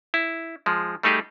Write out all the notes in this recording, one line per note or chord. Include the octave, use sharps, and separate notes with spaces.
E4
F3 G#3
G3 A3 D#4 G4 G#4